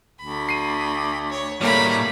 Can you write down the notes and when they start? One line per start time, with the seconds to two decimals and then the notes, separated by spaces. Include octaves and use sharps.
0.20 D2 B5
0.49 C7 D#7
1.30 C#5
1.61 A2 G3 A3 A#3 C#5 A#5 B5